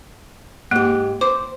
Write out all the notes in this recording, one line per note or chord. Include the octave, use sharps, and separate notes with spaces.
G#2 A#3 G4
C5 D6